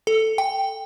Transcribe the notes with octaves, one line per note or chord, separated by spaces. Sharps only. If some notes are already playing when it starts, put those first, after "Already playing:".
A4
G5